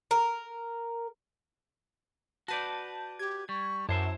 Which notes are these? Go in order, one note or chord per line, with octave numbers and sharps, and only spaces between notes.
A#4
F#4 B4 D5 A5 G6
G4 G#6
G3 C#6
F#2 E4 C5 E5 A5